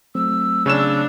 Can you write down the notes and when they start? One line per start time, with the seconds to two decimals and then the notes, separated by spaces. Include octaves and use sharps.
0.15 F#3 A3 C4 E6
0.66 C#3 D4 C#5 E7